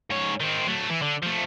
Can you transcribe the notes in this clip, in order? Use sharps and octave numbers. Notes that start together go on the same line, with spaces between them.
G#2 C#5
D#3 C4
F#3 A3
E3
D3
F3 A3